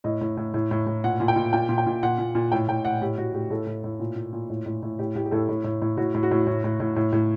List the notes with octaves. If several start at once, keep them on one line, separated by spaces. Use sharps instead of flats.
A2 D#5
A2
A2
A2
A2
A2
A#2 F#5
A#2
G5
A#2
A#2 G5
A#2
G5
A#2
A#2 F#5
A#2
A#2
A2 G5
A2 G5
A2 F#5
A2 G4
A2 F#4
A2 G4
A2 A4
A2
A2
A#2
A#2
A#2
A2
A2
A2
A2 G4
A2 G4
G4
A2 A4
A2
A2
A2
A2 F#4
A2
F#4
A2
A2
A2
A2
A2
A2